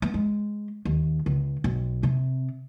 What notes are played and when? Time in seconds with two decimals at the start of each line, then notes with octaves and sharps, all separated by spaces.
0.02 B3
0.14 G#3
0.85 D#2
1.26 C#2
1.64 B1
2.03 C3